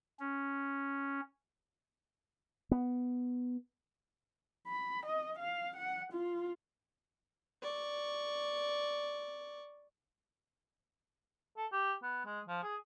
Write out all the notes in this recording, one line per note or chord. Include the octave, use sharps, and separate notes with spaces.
C#4
B3
B5
D#5
F5
F#5
F4
D5 C#6
A4
G4
B3
G#3
F3
G#4